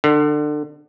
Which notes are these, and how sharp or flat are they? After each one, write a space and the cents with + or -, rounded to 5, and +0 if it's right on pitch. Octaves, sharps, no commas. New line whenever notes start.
D3 +25